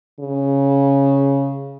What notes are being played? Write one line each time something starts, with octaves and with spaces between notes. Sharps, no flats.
C#3